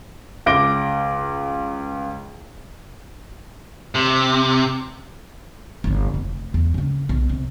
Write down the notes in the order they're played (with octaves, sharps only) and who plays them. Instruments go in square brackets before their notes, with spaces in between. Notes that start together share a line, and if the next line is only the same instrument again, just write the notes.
[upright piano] C#2 D6 A#6 D7 G7
[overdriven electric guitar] C3
[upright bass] G1 E4
F1
E2
C#3 C#4
B1
C3